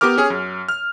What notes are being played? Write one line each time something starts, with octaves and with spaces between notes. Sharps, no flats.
B3 G4 A#4 D6 F6
C#4 G#4
F#2
F6